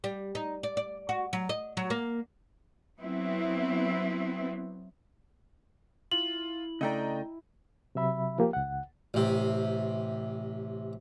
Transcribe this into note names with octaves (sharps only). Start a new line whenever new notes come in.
G3
D#4
D5
D5
F#4
F#3
D#5
F#3
A#3
F#3 B3 C4 E4
E4 F4 F#7
C#3 A3 D4 D#5 G5 A#5
C3 F#3 E5 B5
F3 A#3 G4
C#2 F#5
A1 C3